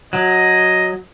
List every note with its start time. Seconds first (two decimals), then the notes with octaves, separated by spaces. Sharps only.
0.13 F#3 D#5